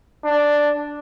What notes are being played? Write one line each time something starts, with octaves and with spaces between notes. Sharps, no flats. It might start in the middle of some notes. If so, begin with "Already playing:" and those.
D4